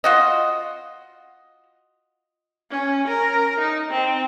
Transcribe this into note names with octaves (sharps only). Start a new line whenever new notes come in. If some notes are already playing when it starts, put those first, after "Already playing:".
F4 F#4 D#5
C#4
A#4
D#4
C4